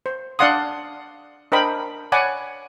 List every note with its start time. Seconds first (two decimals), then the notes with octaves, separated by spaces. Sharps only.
0.06 C5
0.39 D4 D5 F5 F#5 C6 D#6
1.52 D4 A#4 C5 D#5 G5 B5
2.12 C#5 D5 F#5 G#5 B5 D6